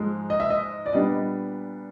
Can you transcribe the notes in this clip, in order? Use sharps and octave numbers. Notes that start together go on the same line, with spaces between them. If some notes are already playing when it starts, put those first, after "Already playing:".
Already playing: G#2 F3 G#3
D#5
E5
D#5
D5
A#2 G3 B3 D4 D#5